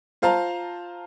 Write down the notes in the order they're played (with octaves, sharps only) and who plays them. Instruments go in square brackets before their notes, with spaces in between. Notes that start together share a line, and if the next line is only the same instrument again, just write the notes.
[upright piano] F4 C5 F5 A5 A#5